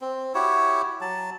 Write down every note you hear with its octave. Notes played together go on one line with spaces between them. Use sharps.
C4
E4 F#4 G4 C#5
F#3 A5